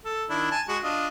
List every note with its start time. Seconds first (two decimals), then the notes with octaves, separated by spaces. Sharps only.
0.05 A4
0.30 D#3 D4 E4
0.51 G#5 A5
0.68 G#3 F#4
0.83 D4 F4 D#5